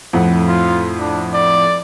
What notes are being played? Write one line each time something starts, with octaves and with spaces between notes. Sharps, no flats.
F2 A2 F#5
F4
D4
D5